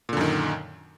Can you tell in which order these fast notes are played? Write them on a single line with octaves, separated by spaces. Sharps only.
A#2 D3 F#2 D#3